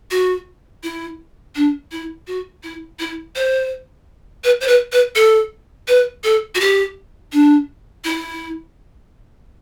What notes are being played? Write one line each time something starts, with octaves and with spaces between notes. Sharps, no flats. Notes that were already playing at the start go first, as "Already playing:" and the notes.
F#4
E4
D4
E4
F#4
E4
E4
C5
B4
C5
B4
B4
A4
B4
A4
F#4
G4
D4
E4